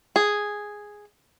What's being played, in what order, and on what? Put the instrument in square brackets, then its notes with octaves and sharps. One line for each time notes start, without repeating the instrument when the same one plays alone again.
[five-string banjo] G#4